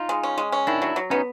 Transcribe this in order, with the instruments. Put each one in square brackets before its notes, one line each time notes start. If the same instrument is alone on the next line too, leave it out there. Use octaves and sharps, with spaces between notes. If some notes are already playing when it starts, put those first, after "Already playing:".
Already playing: [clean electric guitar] D#4 F4
[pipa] G#3
C#4
G#3
C#4
[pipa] D#3 [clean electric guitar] D4 E4
[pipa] F#3
F#3
[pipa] B3 [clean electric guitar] C#4 D#4